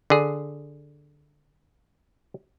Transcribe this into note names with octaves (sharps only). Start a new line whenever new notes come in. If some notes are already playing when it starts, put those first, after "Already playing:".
D3 G#4